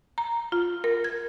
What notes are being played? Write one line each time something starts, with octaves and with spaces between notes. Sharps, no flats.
A#5
F4
A#4
G#6